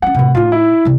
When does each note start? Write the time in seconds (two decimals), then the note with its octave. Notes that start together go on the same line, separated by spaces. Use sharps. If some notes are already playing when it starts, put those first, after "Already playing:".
0.02 A#3 C#4 F#5
0.15 A2 C3
0.35 A2 D#4 F4
0.52 E4
0.85 C3 E3